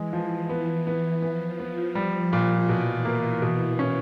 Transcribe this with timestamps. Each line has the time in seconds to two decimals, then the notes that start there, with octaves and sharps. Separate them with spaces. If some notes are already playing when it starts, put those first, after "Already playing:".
Already playing: E3 G#3
0.13 F3
0.49 B3
0.87 B3
1.22 F3 B3
1.60 B3
1.95 G3
2.33 A#2
2.69 B2 E3
3.05 A#3
3.42 B2
3.79 C#4